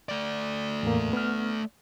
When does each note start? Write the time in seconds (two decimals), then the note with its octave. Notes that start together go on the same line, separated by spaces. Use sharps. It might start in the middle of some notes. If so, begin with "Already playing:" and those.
0.09 A3 D5
0.83 E2 A2 A#3
1.13 B3 F6